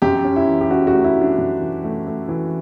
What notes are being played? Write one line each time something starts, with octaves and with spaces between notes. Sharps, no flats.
F#2 G4
C#4
E4
E3
G4
C#4 F#4
F#4
A3
E4
E3
D4
F#2
E3
A3
A3
E3